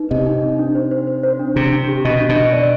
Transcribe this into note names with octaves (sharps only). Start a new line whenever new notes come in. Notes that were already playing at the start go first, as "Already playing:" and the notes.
Already playing: D#4 B4
C3 D#5
D#4
D#4
D4
C5
C5
C5
C5
D4
C3 D4
D4
G4
B2 D#5
D4
B2
D#5
D5